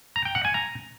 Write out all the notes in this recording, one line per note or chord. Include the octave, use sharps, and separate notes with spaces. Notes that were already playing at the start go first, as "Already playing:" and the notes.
A#5
G5
F#5
G#5
A#5